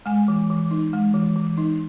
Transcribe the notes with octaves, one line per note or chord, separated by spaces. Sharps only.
G#3 G#5
E3
E3
D#4
G#3
E3
E3
D#4